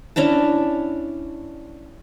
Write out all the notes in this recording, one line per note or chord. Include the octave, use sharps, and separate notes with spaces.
C#4 D4 E4 A5